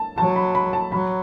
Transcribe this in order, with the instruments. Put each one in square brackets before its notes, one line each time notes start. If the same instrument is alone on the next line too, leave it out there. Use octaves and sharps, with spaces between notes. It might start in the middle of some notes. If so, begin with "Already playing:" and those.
Already playing: [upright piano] A5
[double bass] F#3 [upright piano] A5
[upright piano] B5
B5
A5
[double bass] F#3 [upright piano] B5